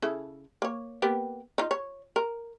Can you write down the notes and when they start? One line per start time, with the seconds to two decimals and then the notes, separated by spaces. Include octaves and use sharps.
0.02 C#3 E4 A4
0.62 A#3 C#5
1.02 A#3 B3 G4
1.58 D#4 F4
1.71 C#5
2.16 A#4